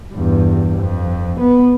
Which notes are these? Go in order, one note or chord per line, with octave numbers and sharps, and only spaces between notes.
E2 G2
F2
B3